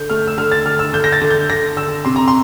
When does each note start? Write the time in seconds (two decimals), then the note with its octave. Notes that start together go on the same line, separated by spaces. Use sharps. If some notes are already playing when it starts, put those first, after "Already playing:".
Already playing: D3 G6
0.10 A3 F6
0.27 E6
0.38 D3 F6
0.52 A6
0.66 D3 F6
0.79 E6
0.93 D3 G6
1.04 A#6
1.13 A6
1.21 D3
1.30 G6
1.50 D3 A#6
1.77 D3 E6
2.05 C3 C6
2.16 A#5
2.28 C6